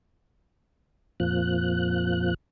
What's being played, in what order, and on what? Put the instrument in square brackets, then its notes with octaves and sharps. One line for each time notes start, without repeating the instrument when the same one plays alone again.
[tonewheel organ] F2 A#2 F3 F#6